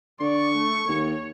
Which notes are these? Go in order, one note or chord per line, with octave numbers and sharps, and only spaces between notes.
D3 D5 C#6
A3
D#2 C#5